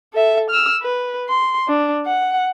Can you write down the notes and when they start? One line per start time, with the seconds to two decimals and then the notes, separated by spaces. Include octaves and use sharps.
0.14 A4 E5
0.50 E6 F6
0.82 B4
1.29 C6
1.68 D4
2.06 F#5